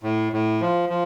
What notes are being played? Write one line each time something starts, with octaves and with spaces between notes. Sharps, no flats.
A2
A2
F3
F3